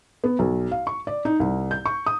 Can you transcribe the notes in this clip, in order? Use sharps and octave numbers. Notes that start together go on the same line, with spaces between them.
B3
B1
F5
C#6
D5
D#4
C2
G6
C#6
D#6